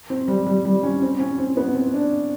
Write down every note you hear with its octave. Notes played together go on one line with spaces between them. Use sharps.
C4
G3
G3
G3
C#4
C4
C#4
C4
B3
C4
D4